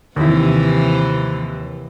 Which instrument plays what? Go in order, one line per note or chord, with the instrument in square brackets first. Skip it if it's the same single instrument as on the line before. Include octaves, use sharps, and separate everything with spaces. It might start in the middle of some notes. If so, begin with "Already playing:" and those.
[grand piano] D#2 E4 [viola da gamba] C3 E3 F3